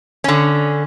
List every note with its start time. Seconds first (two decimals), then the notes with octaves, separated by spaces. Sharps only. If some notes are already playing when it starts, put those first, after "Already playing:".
0.24 D3 C#4